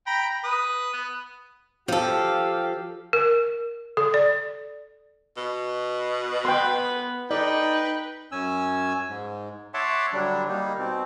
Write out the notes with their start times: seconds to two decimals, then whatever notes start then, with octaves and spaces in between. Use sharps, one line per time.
0.07 G5 A#5 B5
0.44 B4 D#6
0.94 B3
1.88 F3 G4 A4 F5
3.13 A#4
3.97 A4
4.14 D5
5.37 B2
6.45 B3 B4 G5 C6
7.31 D#4 A4 B4 D5 G5
8.32 F#2 C#4 G#5 E6
9.08 G#2
9.74 C#5 E5 F#5 A5 C6 D6
10.13 D3 F#3 G3 D4
10.48 G3 A#3 D#4
10.78 B2 C4